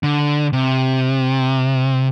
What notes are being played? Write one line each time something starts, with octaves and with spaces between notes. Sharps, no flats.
D3
C3